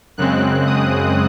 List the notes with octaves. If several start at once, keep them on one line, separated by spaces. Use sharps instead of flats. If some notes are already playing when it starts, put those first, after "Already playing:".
F#2 C#3 G#3 C4 F#6
D#6